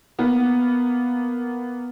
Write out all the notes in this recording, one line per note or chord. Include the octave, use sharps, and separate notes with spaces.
A#3 B3